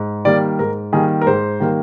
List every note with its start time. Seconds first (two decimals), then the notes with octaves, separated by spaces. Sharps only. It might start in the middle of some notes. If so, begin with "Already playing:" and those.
Already playing: G#2
0.25 D#3 G3 A#3 D5
0.59 G#2 A#4
0.93 D#3 G3 A#3 G#4
1.21 A#4
1.27 G#2 C5
1.60 D#3 G3 A#3